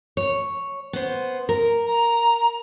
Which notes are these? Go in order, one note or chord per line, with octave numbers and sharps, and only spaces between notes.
C#5
B3 C5
A#4
A#5